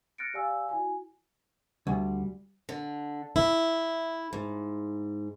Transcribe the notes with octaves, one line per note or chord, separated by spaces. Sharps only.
F6 F#6 A6 A#6 C#7 D7
G4 D5 F5 G#5 E6
E4 F#4 G#5
D2 G3
D3
E4
G#2